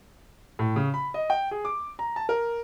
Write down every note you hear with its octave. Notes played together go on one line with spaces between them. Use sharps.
A2
C#3
B5
D#5
G5
G#4
D6
A#5
A5
A#4